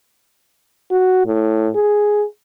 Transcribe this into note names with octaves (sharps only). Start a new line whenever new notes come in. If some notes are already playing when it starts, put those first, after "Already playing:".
F#4
A2
G#4